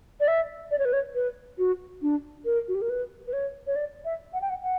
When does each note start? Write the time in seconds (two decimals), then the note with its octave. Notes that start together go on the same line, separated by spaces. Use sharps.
0.20 D5
0.28 E5
0.71 D5
0.79 C#5
0.85 B4
0.93 C#5
1.15 B4
1.58 F#4
2.02 D4
2.45 A#4
2.68 F#4
2.75 G4
2.82 A#4
2.90 B4
3.27 B4
3.33 C#5
3.67 C#5
3.76 D5
4.05 E5
4.33 F#5
4.41 G5
4.50 F#5
4.63 F#5